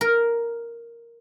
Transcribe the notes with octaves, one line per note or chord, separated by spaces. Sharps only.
A#4